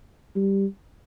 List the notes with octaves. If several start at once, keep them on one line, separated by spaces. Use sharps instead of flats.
G3